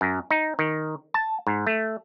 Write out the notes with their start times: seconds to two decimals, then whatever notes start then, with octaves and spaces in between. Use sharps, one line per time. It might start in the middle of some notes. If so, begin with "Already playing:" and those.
0.01 F#2
0.31 D#4
0.59 D#3
1.14 A5
1.47 G#2
1.67 A3